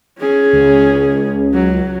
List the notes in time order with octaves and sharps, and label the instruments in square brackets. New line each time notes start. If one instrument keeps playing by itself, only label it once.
[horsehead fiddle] C#4 G#4
[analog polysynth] C#2
[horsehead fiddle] F#3